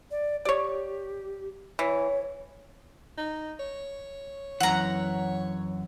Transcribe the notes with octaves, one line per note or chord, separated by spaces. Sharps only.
D5
G4 C#5 D5
E3 C#5
D#4
C#5
F#2 E3 F#5 A#5